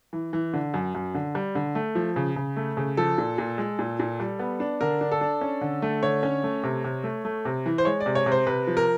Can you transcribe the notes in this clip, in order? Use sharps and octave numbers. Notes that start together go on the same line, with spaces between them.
E3
E3
D3
F#2
F#2
D3
G3
D3
A3
F3
C#3
C#3
A3
C#3
F3 A4
A#2
A#2
G#3
A#2
A#2
G3
B3
D4
D3 A#4
D4
A4
D4
C#4
D3
A3
D3 C#5
C#4
A3
C3
C3
A3
A3
C3
E3
C5
G#3 C#5
D5
C3
C#5
C3
C5
C3 B4
F3
A#4